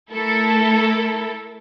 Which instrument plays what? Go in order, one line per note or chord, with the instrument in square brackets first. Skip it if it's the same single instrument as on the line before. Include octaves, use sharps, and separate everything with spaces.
[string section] A3 E4 A4 A#4